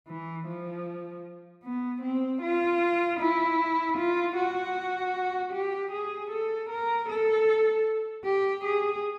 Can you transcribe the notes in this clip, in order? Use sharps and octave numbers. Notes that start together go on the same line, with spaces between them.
E3
F3
B3
C4
F4
E4
F4
F#4
G4
G#4
A4
A#4
A4
G4
G#4